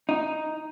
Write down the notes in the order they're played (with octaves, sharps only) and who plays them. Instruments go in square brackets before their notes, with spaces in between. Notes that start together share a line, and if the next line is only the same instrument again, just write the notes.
[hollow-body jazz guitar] D#4